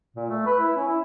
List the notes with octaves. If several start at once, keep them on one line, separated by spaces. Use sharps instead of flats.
A#2
A3
B4
E4
C#4
E4